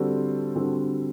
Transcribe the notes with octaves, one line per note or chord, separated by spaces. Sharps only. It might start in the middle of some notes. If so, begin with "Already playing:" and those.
Already playing: D3 G3 C4 F#4 A4
D3 G3 C4 F#4 A4